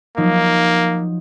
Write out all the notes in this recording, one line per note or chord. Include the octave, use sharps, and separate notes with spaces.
F3 F#3 A#3 D#4